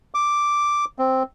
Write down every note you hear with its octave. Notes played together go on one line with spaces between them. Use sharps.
D6
C4